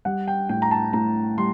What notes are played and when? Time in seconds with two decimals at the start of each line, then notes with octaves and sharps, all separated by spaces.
0.05 G3 F#5
0.28 G5
0.49 A2 G5
0.62 A#5
0.71 A5
0.93 A2 A#5
1.38 G3 C6